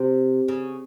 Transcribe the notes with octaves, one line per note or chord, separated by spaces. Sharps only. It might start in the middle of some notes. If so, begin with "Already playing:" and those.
Already playing: C3
C#3